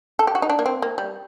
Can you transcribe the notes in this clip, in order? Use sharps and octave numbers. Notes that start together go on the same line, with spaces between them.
A4
G4
F#4
D#4
D4
A#3
C4
A#3
G3